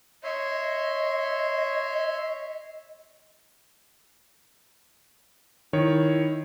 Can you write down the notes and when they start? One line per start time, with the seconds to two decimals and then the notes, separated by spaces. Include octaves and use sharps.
0.24 C#5 D#5 E5 C6
5.73 D#3 E4 C#5